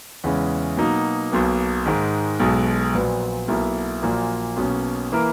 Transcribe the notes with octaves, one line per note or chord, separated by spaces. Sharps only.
E2 C#3 G#3 C#4 E4
B2 F#3 A#3 D#4
B1 B2 A#3
G#2 D#3 G#3
B1 B2 G#3
A#1 A#2 F#3 B3
B1 B2 A#3 E4 A#4
A#1 A#2 F#3 A#3
B1 B2 A#3 C#4
E3 A#3 E4 A#4